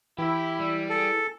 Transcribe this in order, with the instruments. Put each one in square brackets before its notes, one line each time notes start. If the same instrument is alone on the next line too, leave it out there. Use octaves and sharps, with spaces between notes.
[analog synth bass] E3 [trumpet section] E4 [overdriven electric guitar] G4
[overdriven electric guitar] G3
[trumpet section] G#4 [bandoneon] A4